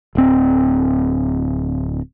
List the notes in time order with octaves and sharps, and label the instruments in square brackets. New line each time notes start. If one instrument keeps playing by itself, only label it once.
[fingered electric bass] D1 C4